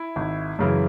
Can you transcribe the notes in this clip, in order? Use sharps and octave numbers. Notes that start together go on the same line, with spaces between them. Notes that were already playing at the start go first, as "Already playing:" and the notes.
Already playing: E4
G#1
F#2 C#3 E3